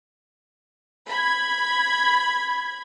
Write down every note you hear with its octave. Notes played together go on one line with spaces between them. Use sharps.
B5 G#6